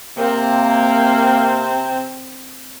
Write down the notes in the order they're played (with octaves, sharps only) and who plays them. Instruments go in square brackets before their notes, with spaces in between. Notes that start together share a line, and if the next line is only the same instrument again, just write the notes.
[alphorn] C3 [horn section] A#3 [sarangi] C4